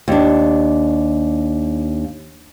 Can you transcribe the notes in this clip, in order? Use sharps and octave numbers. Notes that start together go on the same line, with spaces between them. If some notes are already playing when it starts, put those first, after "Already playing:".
D#2 D4